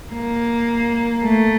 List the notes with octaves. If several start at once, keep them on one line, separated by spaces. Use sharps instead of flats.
A#3
A3